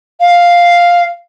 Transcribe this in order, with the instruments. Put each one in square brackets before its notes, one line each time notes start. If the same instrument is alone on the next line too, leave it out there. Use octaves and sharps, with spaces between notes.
[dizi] F5